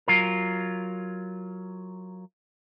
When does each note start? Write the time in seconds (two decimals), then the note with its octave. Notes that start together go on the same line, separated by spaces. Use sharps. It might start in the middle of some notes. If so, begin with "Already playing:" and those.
0.08 F#3 F4 A#4